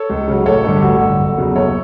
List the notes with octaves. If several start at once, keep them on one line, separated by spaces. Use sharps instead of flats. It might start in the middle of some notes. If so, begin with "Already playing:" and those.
Already playing: A4 C#5
C#2
C#3 F#3
A1 A4 C#5
G2 D3
G4
A1 F#4 A4
G2 D3
F#1
E2 C#3 F#3
F#1 A4 C#5